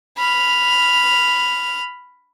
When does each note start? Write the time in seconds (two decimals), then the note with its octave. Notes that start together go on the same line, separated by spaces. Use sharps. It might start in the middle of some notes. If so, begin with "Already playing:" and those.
0.17 B5 F6